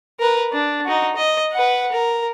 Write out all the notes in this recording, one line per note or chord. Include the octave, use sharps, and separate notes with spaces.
A#4 B4
D4
D#4 F#4
D#5
B4 F#5
A#4